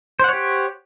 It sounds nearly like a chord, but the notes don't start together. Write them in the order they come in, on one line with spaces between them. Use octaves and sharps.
C5 F#5 C#5 G4